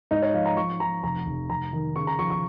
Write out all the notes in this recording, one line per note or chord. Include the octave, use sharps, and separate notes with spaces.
G#2 D#4
C#5
F3 F5
A#5
F3 C#6
F3 A#5
F1 A#5
F1
F1 A#5
D#3
C#3 C#6
A#5
F3 C#6
C#6